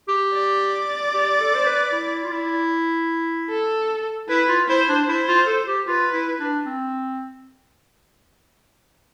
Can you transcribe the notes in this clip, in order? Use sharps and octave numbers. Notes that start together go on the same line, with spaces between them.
G4
D5
G4
A4
C5
B4
E4
F4
E4
A4
E4 B4
F4
E4 C5
D4
E4 C5
F4
A4
G4
F4 B4
E4
D4
C4